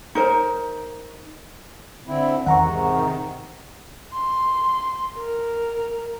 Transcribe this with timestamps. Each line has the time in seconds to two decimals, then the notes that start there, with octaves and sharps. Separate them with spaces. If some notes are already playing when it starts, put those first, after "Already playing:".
0.15 D#4 A#4 C5
2.07 D3 C4 E4
2.46 E2 D#3 C4 F#5 A#5 C#6
2.61 G#2 C3
4.13 C6
5.17 A#4